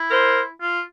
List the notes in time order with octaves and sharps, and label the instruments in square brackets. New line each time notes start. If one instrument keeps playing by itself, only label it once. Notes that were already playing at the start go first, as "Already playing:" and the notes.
Already playing: [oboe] E4
[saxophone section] A#4 C5
[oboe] F4